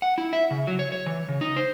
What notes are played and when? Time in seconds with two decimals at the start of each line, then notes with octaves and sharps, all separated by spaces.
0.02 F#5
0.18 E4
0.33 E5
0.51 C#3
0.67 F#3
0.79 C#5
0.92 C#5
1.06 E3
1.28 C#3
1.41 D#4
1.56 C5